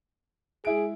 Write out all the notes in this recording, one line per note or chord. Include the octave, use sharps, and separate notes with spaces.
G#3 E4 G#4 D7